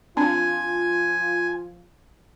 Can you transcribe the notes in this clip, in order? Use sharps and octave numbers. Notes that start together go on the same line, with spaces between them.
F3 C4 D4 F4 G#5 A5